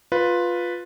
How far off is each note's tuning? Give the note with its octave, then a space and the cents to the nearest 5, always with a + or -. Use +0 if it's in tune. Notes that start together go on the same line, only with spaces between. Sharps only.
F4 +10 B4 -5